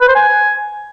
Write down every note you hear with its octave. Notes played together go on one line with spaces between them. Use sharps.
B4
C5
G#5